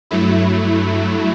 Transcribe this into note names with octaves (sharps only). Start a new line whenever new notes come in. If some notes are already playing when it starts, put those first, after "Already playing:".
G2 F#3 A3 E4